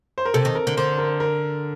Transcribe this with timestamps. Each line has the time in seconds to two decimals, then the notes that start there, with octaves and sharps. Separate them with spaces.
0.18 C5
0.25 A#4
0.34 C3 A4
0.45 D#3
0.55 A#4
0.67 D3
0.77 D3 C5
0.98 A#4
1.20 A#4